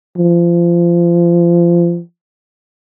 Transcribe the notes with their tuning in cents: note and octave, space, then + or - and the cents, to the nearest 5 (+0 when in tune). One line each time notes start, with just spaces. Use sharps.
F3 -25